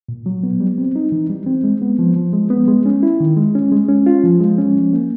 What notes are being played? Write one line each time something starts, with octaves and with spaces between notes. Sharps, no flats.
A#2
F#3
B3
G3
C4
D#4
E3
G3
C4
G#3
B3
F3
F3
G#3
B3
G#3
C#4
E4
D#3
G#3
C#4
G#3
C#4
F4
F3
G#3
C#4
F3
A#3